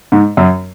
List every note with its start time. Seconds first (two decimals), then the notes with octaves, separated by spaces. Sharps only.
0.12 G#2
0.37 F#2